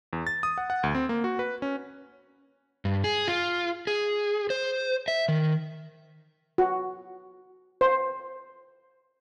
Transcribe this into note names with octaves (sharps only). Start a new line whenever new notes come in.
E2
A6
D#6
F#5
F#5
D2
C4
A#3
F#4
B4
C#4
G2
G#4
F4
G#4
C5
E5
D#3
F#4
C5